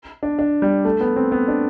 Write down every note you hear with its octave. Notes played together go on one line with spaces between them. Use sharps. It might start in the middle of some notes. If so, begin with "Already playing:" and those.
D4
D4
G3
A3
B3
C4
B3
D4